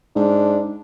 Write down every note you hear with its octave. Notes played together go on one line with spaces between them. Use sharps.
G#2 D4